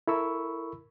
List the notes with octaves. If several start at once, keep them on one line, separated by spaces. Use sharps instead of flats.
E4 A4 A#4 B5 C#6 E6